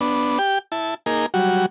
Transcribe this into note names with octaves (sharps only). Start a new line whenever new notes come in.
B3 D4
G4 G5
E4 A5
A#3 D#4 G#4 A#4
F#3 G3 F#4